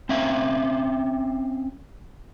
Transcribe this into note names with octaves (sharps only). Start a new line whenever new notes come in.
C4 C#4 E5 F5